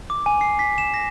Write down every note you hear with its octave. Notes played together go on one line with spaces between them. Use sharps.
D6
G#5
C7
B6
E7
A#6